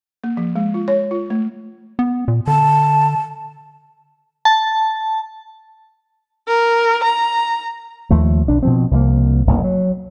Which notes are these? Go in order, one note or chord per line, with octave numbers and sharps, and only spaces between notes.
A#3
F3
G#3
F4
C#5
F4
A3
B3
A#2
D3 A5
A5
A#4
A#5
D#2 F3 A3
B1 D4
B2 F3 C4
C2 F3 G3 A#3
F1 B1 A#3
F#3